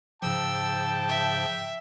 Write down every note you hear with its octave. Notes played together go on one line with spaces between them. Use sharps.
G#2 C#3 F3 G5 A5 E6
E5